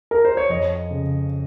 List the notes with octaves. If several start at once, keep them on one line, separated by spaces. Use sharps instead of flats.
A#4
C5
C#5
F2 D#5
C#3